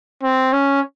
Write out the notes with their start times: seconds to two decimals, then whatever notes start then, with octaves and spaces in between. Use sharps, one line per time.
0.23 C4
0.53 C#4